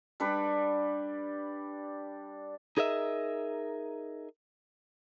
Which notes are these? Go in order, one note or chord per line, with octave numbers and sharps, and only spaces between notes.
G3 D4 B4
D#4 G#4 A#4 D#5 E5